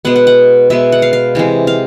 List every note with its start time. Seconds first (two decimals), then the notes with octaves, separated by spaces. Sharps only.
0.05 B2 G#3 B3 F#5
0.16 F#5
0.27 F#5
0.70 B2 G#3 B3 E5
0.92 F#5
1.02 F5
1.13 F5
1.35 C3 E3 G#3
1.67 F5